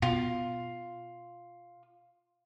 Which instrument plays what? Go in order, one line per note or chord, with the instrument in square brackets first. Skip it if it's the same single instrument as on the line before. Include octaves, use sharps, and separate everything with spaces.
[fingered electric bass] B2 [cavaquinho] F4